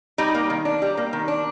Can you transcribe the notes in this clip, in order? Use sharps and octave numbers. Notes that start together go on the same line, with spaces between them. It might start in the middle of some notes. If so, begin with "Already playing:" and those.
G3 D#4
A#3
D#3
D4
G3
A#3
D#3
D4